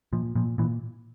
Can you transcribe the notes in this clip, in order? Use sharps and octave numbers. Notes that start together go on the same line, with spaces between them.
A#2 F3
A#2 F3
A#2 E3